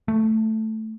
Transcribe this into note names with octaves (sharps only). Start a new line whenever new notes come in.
A3